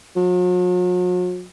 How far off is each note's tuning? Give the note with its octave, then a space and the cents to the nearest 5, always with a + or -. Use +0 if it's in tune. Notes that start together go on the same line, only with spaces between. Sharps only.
F#3 -45